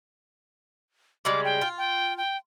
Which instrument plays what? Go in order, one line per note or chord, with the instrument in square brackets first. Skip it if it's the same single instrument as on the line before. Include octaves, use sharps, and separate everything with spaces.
[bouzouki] C#3 G3 G#3 [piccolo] D6
[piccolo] G5
[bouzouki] F4
[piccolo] G5
G5